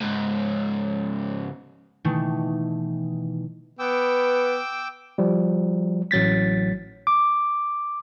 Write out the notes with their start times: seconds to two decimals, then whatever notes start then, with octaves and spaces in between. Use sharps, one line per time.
0.01 C#2 G#2
2.04 B2 D#3 E3 A3
3.79 B3 B4 G5 D6 E6
5.18 F3 G3
6.11 A1 F#3 A6 B6
7.07 D6